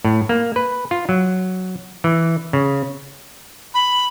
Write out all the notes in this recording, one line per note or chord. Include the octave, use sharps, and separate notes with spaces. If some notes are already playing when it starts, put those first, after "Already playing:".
A2
A#3
B4
F4
F#3
E3
C#3
B5